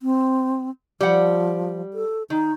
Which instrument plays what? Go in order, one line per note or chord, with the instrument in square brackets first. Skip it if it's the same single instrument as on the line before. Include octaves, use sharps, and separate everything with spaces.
[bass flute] C4
[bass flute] F3 [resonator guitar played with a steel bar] G3 F#5
[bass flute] A4
[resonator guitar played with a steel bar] D#3 [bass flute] D#4